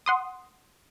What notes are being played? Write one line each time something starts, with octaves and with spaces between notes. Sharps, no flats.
F#5 C6 D#6